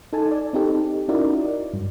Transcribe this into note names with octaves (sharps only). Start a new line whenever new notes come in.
D#4 A4 G#5 A5
D5
C4 D#4 G4 A4
C#4 D#4 E4 F#4 A#4 D5
G2